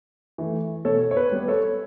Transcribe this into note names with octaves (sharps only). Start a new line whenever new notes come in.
E3 A3
B2 A4 C#5
C#5
B4
G3 B3
A4 C#5